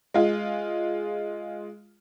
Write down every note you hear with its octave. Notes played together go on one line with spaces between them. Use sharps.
G#3 F4